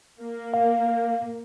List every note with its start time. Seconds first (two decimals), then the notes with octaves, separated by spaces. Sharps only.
0.20 A#3
0.54 F5